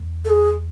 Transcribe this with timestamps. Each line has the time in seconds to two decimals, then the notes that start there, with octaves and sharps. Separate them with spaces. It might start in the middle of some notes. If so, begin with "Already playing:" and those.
Already playing: E2
0.25 A4
0.30 G#4